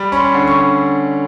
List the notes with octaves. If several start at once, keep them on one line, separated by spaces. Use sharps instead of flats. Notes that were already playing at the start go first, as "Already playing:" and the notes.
Already playing: G3 B5
C#4 B5
C6
D3
C#6
D3